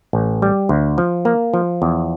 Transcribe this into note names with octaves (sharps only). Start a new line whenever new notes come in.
A1
G3
D2
F3
A#3
F3
E2